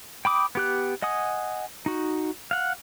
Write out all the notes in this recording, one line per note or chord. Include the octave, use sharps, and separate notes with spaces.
G5 B5 D6 D#6
B3 G4 F#6
D#5 F#5 G#5 D#6
D#4 F#4
F5 F#5